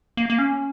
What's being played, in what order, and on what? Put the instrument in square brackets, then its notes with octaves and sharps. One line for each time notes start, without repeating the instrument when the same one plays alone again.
[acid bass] A#3
A#3
C#4